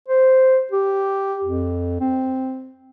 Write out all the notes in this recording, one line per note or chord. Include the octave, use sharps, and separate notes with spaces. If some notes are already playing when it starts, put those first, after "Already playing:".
C5
G4
F2
C4